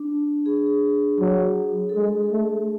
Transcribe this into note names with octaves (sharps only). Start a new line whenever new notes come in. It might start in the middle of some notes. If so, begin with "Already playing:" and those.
Already playing: D4
G#4
F#3
A4
G#3 G#4
A3